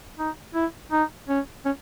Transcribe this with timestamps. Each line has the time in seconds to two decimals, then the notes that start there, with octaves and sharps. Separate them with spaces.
0.19 D#4
0.55 E4
0.92 D#4
1.29 C#4
1.65 C#4